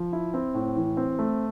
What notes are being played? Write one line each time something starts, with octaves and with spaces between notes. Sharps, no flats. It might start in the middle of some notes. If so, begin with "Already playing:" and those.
Already playing: F3
E4
C4
A2
E3
C4
A3